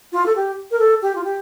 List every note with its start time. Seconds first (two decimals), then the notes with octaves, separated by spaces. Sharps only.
0.12 F4
0.26 A4
0.36 G4
0.71 A#4
0.79 A4
1.02 G4
1.15 F4
1.24 G4